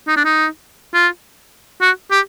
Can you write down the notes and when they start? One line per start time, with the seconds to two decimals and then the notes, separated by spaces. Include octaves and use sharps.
0.07 D#4
0.16 D4
0.25 D#4
0.94 F4
1.81 F#4
2.11 G4